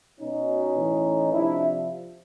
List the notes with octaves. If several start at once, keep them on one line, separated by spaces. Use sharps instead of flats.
B2 C#4 D#4
A2 E3
C3 F3 D4 E4